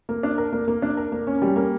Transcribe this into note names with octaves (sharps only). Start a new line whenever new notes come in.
A#3
D4
A#4
A#3
A#3
D4
A#4
A#3
C#4
G3
A#3